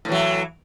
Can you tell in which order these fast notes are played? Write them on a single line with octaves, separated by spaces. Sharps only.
A2 E3 F#3